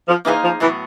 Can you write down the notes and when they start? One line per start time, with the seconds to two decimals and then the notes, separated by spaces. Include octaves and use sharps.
0.08 F3
0.25 E3 A#3 D#4 G#4 C5 F5
0.43 F3
0.60 A2 E3 F#3 B3